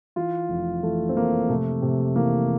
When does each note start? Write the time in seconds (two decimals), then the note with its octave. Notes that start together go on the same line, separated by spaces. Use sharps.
0.16 E3 F4
0.49 F1
0.83 E3 A3
1.09 C4
1.17 F1 A#3
1.49 C3 A3
1.82 C3
2.15 E3 A#3